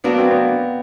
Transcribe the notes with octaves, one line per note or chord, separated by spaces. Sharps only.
F#3 A#3 B3 D4 F#4
C4
B3